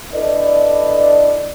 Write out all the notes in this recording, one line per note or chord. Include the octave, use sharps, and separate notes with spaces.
D4 E4 A4 B4 D5 D#5